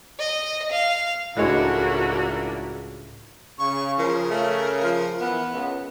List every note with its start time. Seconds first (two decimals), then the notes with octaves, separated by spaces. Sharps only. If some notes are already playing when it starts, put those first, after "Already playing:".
0.20 D#5
0.71 F5
1.37 C#2 A2 G#3 D4 E4 F#4 A#4 C#5
3.59 C#3 C#6
3.98 F3 A#4
4.31 A3
4.83 F3
5.21 E3 B3
5.52 C#2